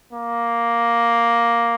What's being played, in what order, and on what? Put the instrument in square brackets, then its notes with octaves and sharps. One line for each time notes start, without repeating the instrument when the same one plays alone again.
[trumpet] A#3